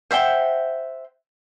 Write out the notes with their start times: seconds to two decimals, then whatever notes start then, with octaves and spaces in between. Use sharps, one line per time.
0.11 C5 E5 F#5 G5